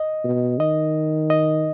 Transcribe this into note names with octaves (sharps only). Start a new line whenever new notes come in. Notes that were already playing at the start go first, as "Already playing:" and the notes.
Already playing: D#5
B2
D#3 D#5
D#5